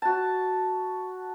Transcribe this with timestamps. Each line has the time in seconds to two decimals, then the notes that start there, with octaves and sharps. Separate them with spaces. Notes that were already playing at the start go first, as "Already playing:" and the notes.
0.02 F#4 A5